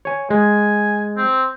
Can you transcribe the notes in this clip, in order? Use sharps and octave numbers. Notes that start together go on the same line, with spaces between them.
C#5 G#5
G#3 G#5
C4